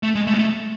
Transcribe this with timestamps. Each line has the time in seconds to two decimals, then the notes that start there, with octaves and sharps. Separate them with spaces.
0.03 A3
0.15 G#3
0.27 A3
0.34 G#3
0.39 A3